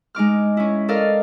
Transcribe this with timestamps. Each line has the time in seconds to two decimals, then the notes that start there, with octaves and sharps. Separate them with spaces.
0.15 G#3 D#4 D6 F6
0.57 C#4 E4
0.89 A4 A#4 D5 D#5 F5